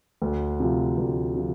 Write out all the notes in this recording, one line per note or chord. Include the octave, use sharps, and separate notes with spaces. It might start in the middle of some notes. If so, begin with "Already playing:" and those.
D2
C3 F3
D2
C3 F3